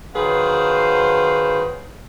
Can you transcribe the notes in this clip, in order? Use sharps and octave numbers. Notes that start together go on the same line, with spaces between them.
D#3 F#3 G#4 B4 C5 F5